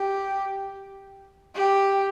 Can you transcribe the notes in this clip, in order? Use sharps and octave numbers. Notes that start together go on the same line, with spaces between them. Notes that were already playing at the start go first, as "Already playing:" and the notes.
Already playing: G4
G4